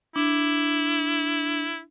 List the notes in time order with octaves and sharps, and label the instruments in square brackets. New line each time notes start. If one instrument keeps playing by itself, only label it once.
[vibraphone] D4 [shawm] E4